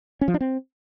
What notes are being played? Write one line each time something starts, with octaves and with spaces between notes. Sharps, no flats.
C#4
F3
D4
C4